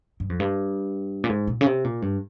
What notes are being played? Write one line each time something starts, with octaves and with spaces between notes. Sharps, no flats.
G2
F2
G2
A#2
G#2
A#2
C#3
C3
A#2
G2